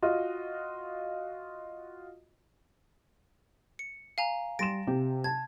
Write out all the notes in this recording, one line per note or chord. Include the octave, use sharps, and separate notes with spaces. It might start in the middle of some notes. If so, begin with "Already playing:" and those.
F4 F#4 D#5
C#7
F5 G#5 A#5
G3 C6 A6 A#6 D7 E7
C3 G4
A5 G#6